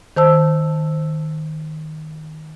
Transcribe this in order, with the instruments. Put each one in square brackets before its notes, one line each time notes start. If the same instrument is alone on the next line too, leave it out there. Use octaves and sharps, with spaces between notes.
[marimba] D#3 C5 A5 E6